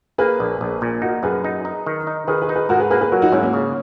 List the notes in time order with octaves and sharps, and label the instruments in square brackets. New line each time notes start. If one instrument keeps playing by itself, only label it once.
[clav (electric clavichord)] A#3 [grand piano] G#4 B4
[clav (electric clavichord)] A#1
A#1
A#2
[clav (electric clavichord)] D#4 [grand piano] F#4 A#4
[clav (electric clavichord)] F#2 [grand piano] G#4 B4
[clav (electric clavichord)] D#4
D#4
D#3
D#4
[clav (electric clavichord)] D#3 [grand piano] G#4 B4
[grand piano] G#4 B4
[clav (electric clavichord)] D#4
[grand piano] G#4 B4
[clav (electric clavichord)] G#2 [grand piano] F#4 A#4
[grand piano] G#4 B4
[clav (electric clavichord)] A#3 [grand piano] G#4 B4
[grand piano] G#4 B4
[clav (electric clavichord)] F#3 [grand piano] F#4 A#4
[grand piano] D#4 F#4
[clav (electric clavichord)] G#2 [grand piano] C#4 E4
[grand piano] A#3 C#4
[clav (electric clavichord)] C#3